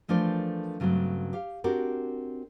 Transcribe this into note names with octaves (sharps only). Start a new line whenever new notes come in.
E3 F3 A3 D4 A#4 C5
G2 C#3 F#3 A3 C4
G4 F5
C4 D4 F#4 G4 A#4